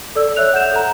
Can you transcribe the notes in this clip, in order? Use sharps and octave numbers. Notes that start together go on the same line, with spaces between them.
A4 D5 E6
C#5 E5 F#6 F7
F#5 G6 E7
A4 A#5